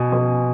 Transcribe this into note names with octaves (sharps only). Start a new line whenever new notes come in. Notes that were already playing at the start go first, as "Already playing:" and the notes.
Already playing: B2 G#5
B2